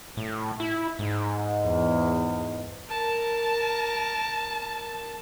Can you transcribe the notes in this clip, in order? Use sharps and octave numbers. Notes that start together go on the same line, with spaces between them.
A2
E4
G#2
E2
A#4 A5